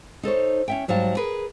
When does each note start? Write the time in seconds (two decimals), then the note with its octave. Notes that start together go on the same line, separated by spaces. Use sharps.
0.23 D#4 A4 C5 C#5
0.68 C#4 E5 G5
0.88 G#2 F#3 G3 F5 A5
1.17 G#4 A#4 B4